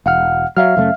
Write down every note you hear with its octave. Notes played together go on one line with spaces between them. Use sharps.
E1 F5 F#5 F6
F#3 E5 F5 F6
F#2 C#3 A3